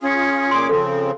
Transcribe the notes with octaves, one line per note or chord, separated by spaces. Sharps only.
C#4 F4 G#4
A#2 G#4 C6 D6
C#3 F3 C4 A4